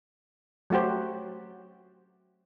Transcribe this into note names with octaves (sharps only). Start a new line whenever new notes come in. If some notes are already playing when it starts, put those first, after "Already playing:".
F#3 A3 F#4 G4 C5